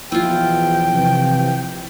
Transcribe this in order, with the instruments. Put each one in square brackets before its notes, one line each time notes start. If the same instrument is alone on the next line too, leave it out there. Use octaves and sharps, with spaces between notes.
[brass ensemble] E2 B2 F3 [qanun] E4 F4 [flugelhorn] G5
[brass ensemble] C3 E3 F3